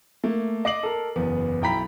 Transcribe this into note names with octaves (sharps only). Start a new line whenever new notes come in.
A3 A#3
D#5 D6 C7 F#7
A4 A#4
F#1 E2 B3
B1 E4 G5 A#5 B5 B6